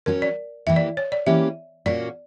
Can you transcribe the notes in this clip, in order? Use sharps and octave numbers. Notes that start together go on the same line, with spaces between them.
F#3 C#4 F#4 A#4
D5
E3 A#3 E4 G4 E5
D5
C#5
D5
E3 A#3 C#4 G4 E5
A#2 A#3 C#4 F#4 D5